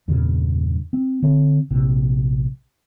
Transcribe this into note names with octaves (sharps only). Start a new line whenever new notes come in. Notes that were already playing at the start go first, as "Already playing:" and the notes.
E2 G2 A#2 C#3
C4
D3 C4
A#1 C3